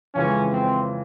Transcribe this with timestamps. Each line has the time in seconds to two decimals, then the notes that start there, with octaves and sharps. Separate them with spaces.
0.15 F2 C#3 E3 G#3 C#4
0.52 C4